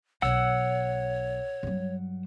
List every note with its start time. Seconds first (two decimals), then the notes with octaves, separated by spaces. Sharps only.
0.22 B1 C#5 F#5 E6
1.63 G2 F#3